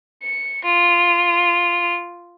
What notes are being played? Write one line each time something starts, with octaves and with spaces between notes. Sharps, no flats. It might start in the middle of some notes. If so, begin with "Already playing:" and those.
C#7
F4